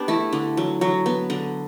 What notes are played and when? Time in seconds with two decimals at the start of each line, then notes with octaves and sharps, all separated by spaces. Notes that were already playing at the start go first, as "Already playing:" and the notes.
Already playing: B3 D4 G4
0.08 A3 E4
0.33 D3
0.57 F#3
0.81 F#3
1.06 B3
1.30 D3